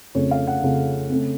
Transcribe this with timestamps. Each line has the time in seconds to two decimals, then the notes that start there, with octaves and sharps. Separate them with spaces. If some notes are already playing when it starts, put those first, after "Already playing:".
0.15 F2 C#3 A3 C#4 C#5
0.31 F5
0.47 F#5
0.63 F2 C#3 A3 C#4
1.09 C#3 A3 C4